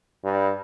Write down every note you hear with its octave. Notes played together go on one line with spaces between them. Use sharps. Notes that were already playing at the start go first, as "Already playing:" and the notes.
G2